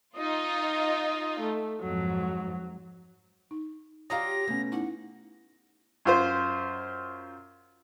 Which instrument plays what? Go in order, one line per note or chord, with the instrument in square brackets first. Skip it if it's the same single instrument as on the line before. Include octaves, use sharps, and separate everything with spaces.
[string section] D#4 F4 [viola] D#5
[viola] A3
[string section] F2 G#2 [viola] F#3
[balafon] D#4
[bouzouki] F#3 F4 G4 [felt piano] F5 A#5 D#6 [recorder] A#6
[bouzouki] B2 [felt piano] A3 B3 C#4
[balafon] D#4 E4 [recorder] F#5
[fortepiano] F#2 F4 C5